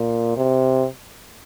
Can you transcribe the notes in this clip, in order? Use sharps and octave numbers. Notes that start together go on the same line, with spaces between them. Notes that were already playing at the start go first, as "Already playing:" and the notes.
Already playing: A#2
C3